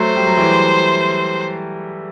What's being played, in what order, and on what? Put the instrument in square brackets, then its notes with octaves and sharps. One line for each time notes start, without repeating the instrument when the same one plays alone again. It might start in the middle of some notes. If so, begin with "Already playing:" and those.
Already playing: [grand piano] F#3 A3 [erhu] C5
[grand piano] G3
F#3
E3 G3